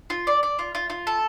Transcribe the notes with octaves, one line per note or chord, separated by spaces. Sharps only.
F4
D5
D5
F4
F4
F4
A4